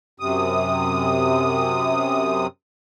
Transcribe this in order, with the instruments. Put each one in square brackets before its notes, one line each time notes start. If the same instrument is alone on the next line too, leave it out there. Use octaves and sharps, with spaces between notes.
[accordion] F#2 C3 D#6